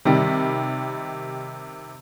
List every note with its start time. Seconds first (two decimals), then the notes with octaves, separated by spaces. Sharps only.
0.05 C3 D#3 G3